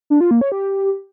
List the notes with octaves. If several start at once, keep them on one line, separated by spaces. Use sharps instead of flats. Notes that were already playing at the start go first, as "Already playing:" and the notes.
D4
F4
A#3
C#5
G4